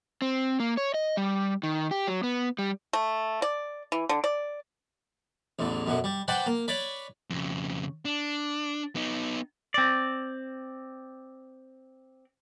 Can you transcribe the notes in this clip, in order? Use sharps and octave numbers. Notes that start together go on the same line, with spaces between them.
C4
A#3
C#5
D#5
G3
D#3
G4
F#3
B3
G3
A3
D5
E3
D3
D5
A1 E2 D3
F#2 B2 D3
G3
B4 C5 D5 F#5 G5 A5
A#3
B4 C#5 D5 B5
F2 C#3
D4
B3 D#4
C4 D5